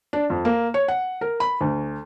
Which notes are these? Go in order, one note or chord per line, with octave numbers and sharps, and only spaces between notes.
D4
F2
A#3
C#5
F#5
A#4
B5
D2